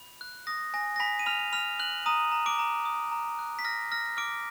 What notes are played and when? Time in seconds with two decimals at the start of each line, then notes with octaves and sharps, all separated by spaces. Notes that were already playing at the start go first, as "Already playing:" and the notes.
Already playing: B5
0.21 F#6
0.47 D#6 A#6
0.74 G#5 A#6
0.96 A#6
1.00 G#5 B5 B6
1.19 D#7
1.26 B5 F6 F7
1.53 B5 F6 F7
1.79 F#6 F#7
2.06 A#5 D#6 D#7
2.32 A#5
2.46 D6 D7
2.59 A#5
2.85 D#6
3.12 A#5
3.39 F#6
3.59 B6
3.65 F6 A#6
3.92 F6 A#6
4.17 D6 F6 D7